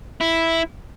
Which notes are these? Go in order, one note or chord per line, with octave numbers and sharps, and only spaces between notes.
E4